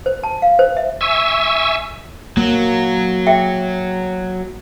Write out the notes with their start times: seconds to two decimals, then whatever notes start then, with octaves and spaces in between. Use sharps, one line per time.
0.06 C5
0.23 A5
0.42 F5
0.59 C5
0.77 E5
1.01 E5 G#5 C#6 E6
2.37 F#3 A#3
3.27 G#4 E5 G5